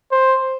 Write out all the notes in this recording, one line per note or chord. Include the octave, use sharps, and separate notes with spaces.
C5